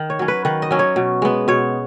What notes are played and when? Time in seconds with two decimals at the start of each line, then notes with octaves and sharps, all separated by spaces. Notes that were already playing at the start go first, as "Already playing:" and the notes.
Already playing: D#3
0.10 C#5
0.19 F#3 C#4
0.28 B4
0.45 D#3 B4
0.62 D#5
0.71 F#3 C#4
0.79 C#5
0.96 B2
1.22 G#3 B3
1.48 B2 C#5